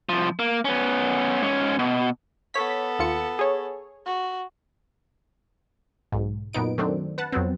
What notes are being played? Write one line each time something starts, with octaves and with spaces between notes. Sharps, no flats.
C2 F3
A#3
B3 C#4
G#2 C#4
B2
B3 A4 C#5 B6
D#2 F4 C#7
G#4 C#5
F#4
B1 G#2
F#2 A#2 B3 D#4 D7
D#3 F#3 A3 C4 D4
B4 F#5 A5
F2 F#3 B3 C4